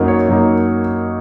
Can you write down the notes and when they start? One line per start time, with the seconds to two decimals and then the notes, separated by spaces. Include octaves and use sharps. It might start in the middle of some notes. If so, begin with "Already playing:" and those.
Already playing: F#2 F#3 A#3 D#4 A#4
0.08 C#5
0.29 F#2 F#3 A#3 D#4